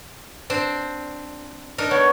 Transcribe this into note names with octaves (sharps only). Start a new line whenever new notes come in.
C4 D4 C5
D4 D#4 A#4
B3 C#5